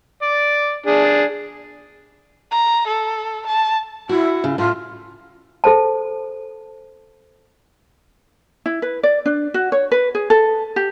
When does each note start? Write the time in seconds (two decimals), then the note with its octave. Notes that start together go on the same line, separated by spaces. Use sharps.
0.22 D5
0.86 D4 G#4
2.51 A#5
2.87 A4
3.47 A5
4.09 E4 F#4
4.44 C#3
4.58 A2 F4
5.64 A4 C5 A5
8.66 E4
8.82 B4
9.03 D5
9.26 D4
9.54 F#4
9.72 C#5
9.92 B4
10.15 G#4
10.30 A4
10.76 G4